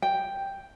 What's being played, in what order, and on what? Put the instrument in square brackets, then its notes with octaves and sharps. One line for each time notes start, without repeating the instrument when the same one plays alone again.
[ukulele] G5